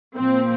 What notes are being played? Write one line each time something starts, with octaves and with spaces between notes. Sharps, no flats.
A#2 F3 C4